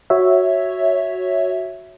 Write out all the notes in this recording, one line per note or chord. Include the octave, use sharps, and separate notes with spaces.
F#4 C#5 E5